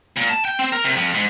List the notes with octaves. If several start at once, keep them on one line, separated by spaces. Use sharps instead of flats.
A#2
A5
G5
C4
A#4
C3
F2
G#2